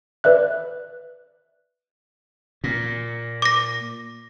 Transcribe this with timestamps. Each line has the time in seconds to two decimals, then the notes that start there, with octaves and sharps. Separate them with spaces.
0.24 B4 D5 E5 F#6
2.64 A#2
3.42 D6 A#6